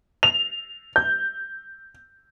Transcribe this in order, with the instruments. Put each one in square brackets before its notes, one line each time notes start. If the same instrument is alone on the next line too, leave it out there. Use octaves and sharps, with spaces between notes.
[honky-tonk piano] F7
G6